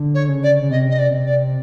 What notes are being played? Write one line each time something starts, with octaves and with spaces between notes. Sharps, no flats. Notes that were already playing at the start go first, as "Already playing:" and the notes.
Already playing: D3
C#5
C#3
D5
C#3
C3 D#5
D#5
D5
C3
D5